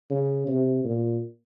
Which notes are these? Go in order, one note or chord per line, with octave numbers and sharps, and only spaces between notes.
C#3
C3
A#2